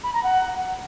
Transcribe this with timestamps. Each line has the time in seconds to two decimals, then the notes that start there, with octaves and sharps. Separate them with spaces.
0.03 B5
0.13 A#5
0.23 F#5